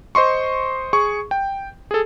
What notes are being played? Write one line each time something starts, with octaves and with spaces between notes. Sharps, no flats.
C5 D#5 C6 C#6
G#4 C#6
G5
G#4 A4